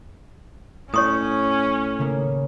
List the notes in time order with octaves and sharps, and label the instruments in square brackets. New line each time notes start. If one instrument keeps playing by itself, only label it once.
[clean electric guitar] A2 [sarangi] C#4 [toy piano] C#5 C#6 D#6
[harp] C#3 A#3